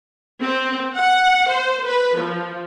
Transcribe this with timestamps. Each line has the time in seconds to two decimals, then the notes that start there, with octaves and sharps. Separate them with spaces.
0.41 C4
0.95 F#5
1.48 C5
1.85 B4
2.18 F3